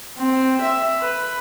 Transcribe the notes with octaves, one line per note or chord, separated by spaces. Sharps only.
C4
E5
B4